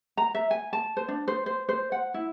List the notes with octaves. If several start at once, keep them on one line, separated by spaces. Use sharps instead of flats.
A#5
E5
G#5
A5
C5
D4
C5
C5
C5
F#5
E4